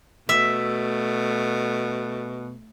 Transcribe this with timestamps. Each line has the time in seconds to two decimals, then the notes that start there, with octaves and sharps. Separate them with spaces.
0.29 B2 A3 E5